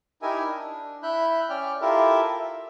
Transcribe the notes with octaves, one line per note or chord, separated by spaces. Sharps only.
D#4 E4 G4 A#4 E5 G#5
D4
E4 E5 B5 F#6 G6
C#4 D5 G5 F6
E4 F4 G4 A4 A#4 E5
E5